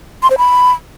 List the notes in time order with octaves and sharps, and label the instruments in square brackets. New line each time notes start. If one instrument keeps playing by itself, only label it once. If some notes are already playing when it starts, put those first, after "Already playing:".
[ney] C6
C5
B5